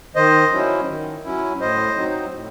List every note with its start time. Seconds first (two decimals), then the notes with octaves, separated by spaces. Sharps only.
0.15 D#3 C5 D#5
0.52 F#3 C#4 E4
0.88 D#3
1.24 F#3 C#4 E4
1.60 A2 C5 D#5
1.97 F#3 C4 D#4
2.33 A2